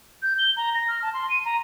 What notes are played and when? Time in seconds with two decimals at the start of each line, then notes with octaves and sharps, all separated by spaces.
0.22 G6
0.39 G7
0.57 A#5
0.74 A#6
0.88 F6
1.02 A5
1.14 C6
1.30 D#7
1.45 A#5